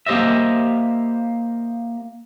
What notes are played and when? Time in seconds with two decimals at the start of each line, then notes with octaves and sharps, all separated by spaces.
0.06 A#3 G4 C5 D#5 E5